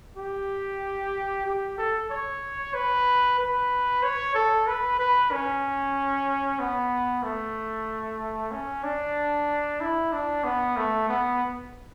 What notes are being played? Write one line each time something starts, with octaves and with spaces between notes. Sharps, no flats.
G4
G4
A4
C#5
B4
B4
C#5
A4
B4
B4
C#4
B3
A3
C#4
D4
E4
D4
B3
A3
B3